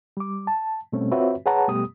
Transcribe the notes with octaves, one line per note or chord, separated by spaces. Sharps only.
G3 D6
A5
B2 G3 A3 C4 C#4
C4 F4 F#4 B4 C#5 E5
G#4 B4 C#5 F#5 A5 A#5
B2 G3 A3 B3 G4 D#6